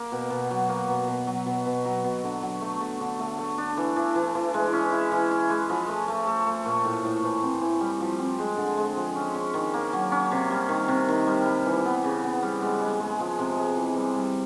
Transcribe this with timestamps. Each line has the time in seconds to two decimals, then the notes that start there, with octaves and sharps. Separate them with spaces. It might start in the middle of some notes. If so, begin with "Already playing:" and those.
Already playing: A#3
0.12 B2
0.30 B2
0.51 F#3
0.69 A#3
0.89 B2
1.08 B2
1.27 F#3
1.46 B2
1.66 B2
1.85 F#3
2.04 B2
2.24 D3
2.42 F#3
2.61 A3
2.80 A3
3.00 D3
3.19 A3
3.39 A3
3.58 D4
3.77 E3
3.96 E3
4.15 E3
4.35 E3
4.54 G#3
4.73 C#4
4.92 E4
5.12 E3
5.31 E4
5.50 G#3
5.69 F3
5.88 A3
6.08 A3
6.27 A3
6.47 A3
6.66 A#2
6.85 A2
7.05 A2
7.23 E3
7.43 C4
7.62 E3
7.81 G3
8.00 F3
8.19 C4
8.39 G#3
8.57 D3
8.77 G#3
8.97 F3
9.16 C#4
9.35 C#4
9.54 D#3
9.74 A#3
9.93 F#3
10.12 C#4
10.32 C3
10.50 G3
10.69 D#3
10.88 C3
11.09 D#3
11.27 G3
11.46 G3
11.66 E3
11.85 B3
12.04 C#3
12.24 B3
12.43 G3
12.62 G#3
12.81 G#3
13.00 G#3
13.20 F3
13.39 C3
13.58 G#3
13.77 E3
13.96 G3
14.16 G3